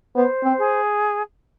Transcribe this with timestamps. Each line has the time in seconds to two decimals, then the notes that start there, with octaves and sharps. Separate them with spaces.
0.15 B3 C5
0.43 C4
0.58 G#4